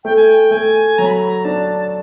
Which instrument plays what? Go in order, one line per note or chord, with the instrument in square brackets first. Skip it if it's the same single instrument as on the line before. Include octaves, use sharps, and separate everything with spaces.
[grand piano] A3 [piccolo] G5
[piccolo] G#5
G5
[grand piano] A3 [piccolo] G#5
[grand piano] F#3 [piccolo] A#5
[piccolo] B5
A#5
[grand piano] D4 [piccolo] A5